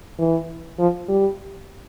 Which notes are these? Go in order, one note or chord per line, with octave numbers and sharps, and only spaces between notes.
E3
F3
G3